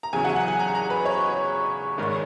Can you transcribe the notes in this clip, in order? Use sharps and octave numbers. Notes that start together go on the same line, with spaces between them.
A#5
E2 C#3 F#3 G#5
F#5
F#5
G#5
A#5
A#5
B4
C#5
G#1 G#2 D#3